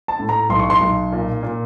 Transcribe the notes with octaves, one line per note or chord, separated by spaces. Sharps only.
A5
A2
A#5
B1 C6
C#6
C6
B1
A#2
A#2